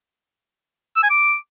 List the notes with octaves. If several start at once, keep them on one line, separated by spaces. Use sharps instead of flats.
E6
G#5
D6